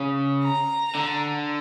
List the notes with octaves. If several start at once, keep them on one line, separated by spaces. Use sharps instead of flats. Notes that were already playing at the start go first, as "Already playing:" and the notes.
Already playing: C#3
A#5
D3